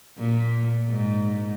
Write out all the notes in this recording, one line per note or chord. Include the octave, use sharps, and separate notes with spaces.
A#2
G#2